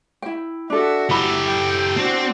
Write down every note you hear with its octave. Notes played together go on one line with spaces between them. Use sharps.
E4 G5
D4 F#4 A4 E5
E4 G4 A4 B5
G5
C4 D4 F#4 C5